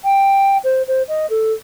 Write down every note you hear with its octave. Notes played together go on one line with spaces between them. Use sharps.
G5
C5
C5
D#5
A4